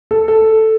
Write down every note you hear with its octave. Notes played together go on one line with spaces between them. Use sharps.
A4
A4